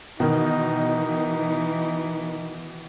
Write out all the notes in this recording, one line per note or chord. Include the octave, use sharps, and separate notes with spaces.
B2 D#3 E3 D#4